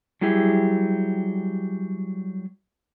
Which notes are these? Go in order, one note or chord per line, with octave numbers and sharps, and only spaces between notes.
F#3 G3 E4 G4 G#4 E5